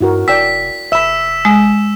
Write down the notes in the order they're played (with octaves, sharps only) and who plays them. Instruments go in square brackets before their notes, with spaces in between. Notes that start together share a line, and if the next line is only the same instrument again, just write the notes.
[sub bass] G2 [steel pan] E4 F#4 A#4
[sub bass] F1 [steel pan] D5 G5 E6 [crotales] B6
[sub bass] F1 [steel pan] E5 B5 [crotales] E6 E7
[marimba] G#3 [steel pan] D#6